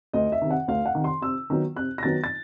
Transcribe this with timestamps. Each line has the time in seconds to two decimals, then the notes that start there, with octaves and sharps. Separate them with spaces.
0.13 D2 D#5
0.32 E5
0.42 C3 D#3
0.51 F#5
0.68 D2 F5
0.85 F#5
0.95 C3 D#3
1.04 C6
1.22 C3 E6
1.50 D#3 F#3 B3
1.76 C3 F#6
1.98 A#6
2.03 D#3 F#3 B3 A6
2.24 A6